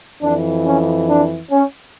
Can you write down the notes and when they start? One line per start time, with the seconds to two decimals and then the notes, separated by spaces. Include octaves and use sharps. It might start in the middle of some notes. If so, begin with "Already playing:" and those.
0.21 F2 E3 D4
0.64 C#4
1.08 D4
1.50 C#4